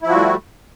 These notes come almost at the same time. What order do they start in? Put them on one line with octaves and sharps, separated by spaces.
E4 F3 F#4 G3 A3